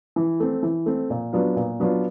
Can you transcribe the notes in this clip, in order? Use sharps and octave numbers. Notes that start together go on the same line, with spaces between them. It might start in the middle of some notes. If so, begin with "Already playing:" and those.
E3
A3 C4
E3
A3 C4
A#2
F#3 B3 D4 F4
A#2
F#3 B3 D4 F4